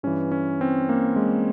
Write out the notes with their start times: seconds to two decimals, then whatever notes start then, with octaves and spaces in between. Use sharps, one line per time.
0.03 G2 E3 C#4
0.32 C#4
0.61 C4
0.89 A#3
1.16 G#3